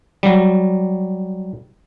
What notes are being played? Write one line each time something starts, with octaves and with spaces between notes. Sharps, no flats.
F#3 G3